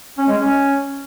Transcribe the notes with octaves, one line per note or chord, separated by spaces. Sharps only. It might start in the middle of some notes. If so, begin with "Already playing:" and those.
C#4
G#3
C#4